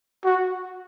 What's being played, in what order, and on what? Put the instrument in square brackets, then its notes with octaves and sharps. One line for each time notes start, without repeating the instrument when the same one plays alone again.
[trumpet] F#4